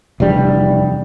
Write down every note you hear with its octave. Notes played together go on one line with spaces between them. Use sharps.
F1 E2 G3 D4